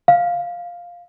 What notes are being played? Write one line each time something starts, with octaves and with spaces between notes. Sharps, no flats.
F5